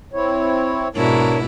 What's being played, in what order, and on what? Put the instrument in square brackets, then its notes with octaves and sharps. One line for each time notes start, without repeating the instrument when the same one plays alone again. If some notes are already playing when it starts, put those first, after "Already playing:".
[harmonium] C4 E4 C#5
[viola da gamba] G#2 B2 E4 [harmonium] D4 A#4 C#5